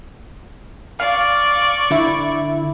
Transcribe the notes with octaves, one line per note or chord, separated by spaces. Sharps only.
D5 F5 C#6
D3 E4